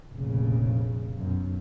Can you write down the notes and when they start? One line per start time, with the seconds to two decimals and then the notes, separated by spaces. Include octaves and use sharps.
0.13 F1 A#1 C#3
1.19 B1 F#2